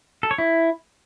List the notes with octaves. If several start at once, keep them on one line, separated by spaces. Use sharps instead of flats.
A4
C#5
E4